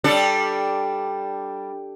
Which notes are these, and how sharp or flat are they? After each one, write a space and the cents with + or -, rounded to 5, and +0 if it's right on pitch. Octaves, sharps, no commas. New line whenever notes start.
G3 +0 D4 +0 A4 +0